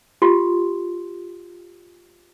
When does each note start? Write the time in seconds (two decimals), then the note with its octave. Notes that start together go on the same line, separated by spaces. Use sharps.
0.22 F4 G4 C6